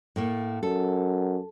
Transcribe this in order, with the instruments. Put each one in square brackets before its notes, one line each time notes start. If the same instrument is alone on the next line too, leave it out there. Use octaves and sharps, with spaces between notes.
[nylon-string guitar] A2 A3 A#3
[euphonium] F#2 [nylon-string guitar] A4